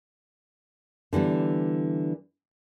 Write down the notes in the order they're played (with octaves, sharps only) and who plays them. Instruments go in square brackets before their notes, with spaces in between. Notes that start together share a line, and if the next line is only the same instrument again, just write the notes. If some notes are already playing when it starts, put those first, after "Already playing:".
[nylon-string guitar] D3 E3 G3 B3